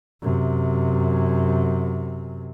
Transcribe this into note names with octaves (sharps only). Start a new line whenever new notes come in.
F#2 C3